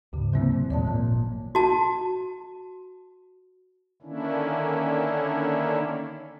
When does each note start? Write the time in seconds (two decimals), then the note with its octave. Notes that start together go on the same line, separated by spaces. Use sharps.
0.13 D2 G#2 C#3
0.33 C3 E3 F#3 A#3 C4
0.70 D#2 A#2 G#3 C#5 D5 A5
0.85 G#1 A#2 F3
1.55 F#4 A5
4.02 D3 D#3 A#3 C#4 D4 E4